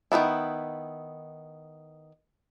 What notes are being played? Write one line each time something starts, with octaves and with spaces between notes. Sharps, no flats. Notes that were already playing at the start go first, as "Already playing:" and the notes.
D#3 F#3 B3 E4